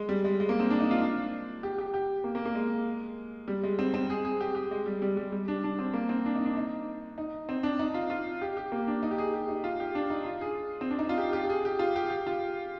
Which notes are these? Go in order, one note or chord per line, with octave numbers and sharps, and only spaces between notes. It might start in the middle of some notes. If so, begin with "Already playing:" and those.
Already playing: G#3
G3
G#3
G#3
A#3
C4
D4
D#4
F4
D4
G4
G4
G4
A#3
A#3
A#3
G#3
G3
G#3
C4
C4
G#4
G#4
G4
G4
G#3
G3
G3
G3
G3
D4
D4
C4
A#3
C4
D4
D#4
D4
D#4
D#4
C4
D4
D#4
F4
F4
G4
G4
A#3
D4
D#4
G4
G#4
G4
D#4
F4
G4
D4
D#4
F4
G#4
C4
D4
D#4
F4
G4
G4
G#4
G4
F4
G4
G4
F4